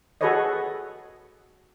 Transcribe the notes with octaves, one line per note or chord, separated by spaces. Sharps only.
F#4 G#4 A4 B4 C#5 D#5